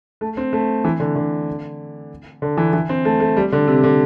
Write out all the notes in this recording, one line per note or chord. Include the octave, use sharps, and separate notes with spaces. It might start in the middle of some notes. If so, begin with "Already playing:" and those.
A3
C4
A3
E3
D3
D3
D3
E3
E3
C4
A3
A3
G3
D3
C3
D3